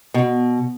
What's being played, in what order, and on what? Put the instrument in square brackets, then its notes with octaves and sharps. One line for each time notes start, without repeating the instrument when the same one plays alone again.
[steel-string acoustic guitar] B2